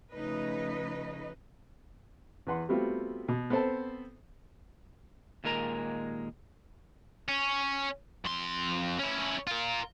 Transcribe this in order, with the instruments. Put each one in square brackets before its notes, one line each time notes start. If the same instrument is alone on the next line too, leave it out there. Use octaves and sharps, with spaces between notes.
[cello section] C#3 F3 A3 D#4 B4 D#5
[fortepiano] E2 B4 F#5 C6
G3 A3 B3 C4 F4 F#4
B2
B3 C4 A4 C5 A5
[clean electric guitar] D#2 A#2 G#3 A#4 A#5
[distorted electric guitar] C#4
F2 C6
C#4 E4
F4 A#4